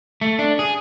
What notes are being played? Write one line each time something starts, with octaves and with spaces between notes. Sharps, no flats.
A3
D4
G#4